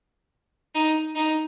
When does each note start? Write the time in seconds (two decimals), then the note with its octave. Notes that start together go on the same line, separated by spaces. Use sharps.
0.75 D#4
1.15 D#4